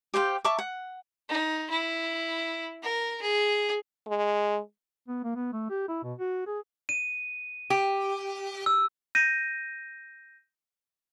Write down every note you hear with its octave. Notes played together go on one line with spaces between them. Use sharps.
G4 C5 F5 G5
E5 A5 C#6 D6
F#5
D#4
E4
A#4
G#4
G#3
B3
A#3
B3
A3
G4
E4
B2
F#4
G#4
D#7
G4
E6
G6 A#6 D#7